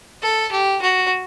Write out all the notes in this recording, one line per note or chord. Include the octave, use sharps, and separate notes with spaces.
A4
G4
F#4